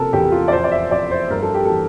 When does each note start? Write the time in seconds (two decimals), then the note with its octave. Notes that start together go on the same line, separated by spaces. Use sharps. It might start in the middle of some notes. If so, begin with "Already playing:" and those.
Already playing: C3 F3 A4 A#4
0.13 E2 G4
0.32 F4
0.48 D5
0.52 F2 C5
0.64 D5
0.72 E5
0.91 F2 D5
1.11 C5
1.30 G2 A#4
1.42 A4
1.54 G4
1.65 E3 A4